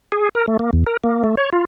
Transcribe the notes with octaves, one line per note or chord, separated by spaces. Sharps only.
G#4
A#4
A3
A#3
E2
A#4
A#3
A3
C#5
F4